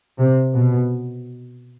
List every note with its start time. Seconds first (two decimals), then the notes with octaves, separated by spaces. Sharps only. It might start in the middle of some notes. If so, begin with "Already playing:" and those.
0.19 C3
0.54 B2